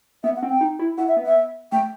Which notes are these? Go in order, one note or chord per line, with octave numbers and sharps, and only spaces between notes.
B3 E5
F#5
C4
G5
D#4
E4
E4 F#5
E5
B3
E5
A3 G5